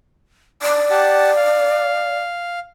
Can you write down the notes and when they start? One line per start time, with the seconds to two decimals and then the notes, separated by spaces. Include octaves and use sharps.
0.62 D5
0.90 G4 F#5 A5
1.36 F5